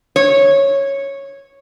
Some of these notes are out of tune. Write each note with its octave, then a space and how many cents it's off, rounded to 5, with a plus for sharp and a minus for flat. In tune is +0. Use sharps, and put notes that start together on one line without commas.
C#5 -5